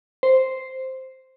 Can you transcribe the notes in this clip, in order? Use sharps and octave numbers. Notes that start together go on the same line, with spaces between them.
C5